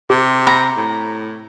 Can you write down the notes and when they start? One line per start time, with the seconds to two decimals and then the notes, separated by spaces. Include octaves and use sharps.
0.10 C3 G4
0.47 A#5 B5 A#6
0.77 A2